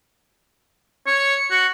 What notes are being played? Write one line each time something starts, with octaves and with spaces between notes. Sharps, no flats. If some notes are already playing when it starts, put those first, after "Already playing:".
C#5 C#7
F#4